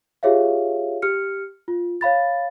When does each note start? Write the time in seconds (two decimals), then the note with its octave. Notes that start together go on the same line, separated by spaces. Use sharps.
0.23 F4 G4 G#4 C#5 E5 F5
1.02 G4 F6 C#7
1.68 F4
2.01 C#5 F5 B5 A6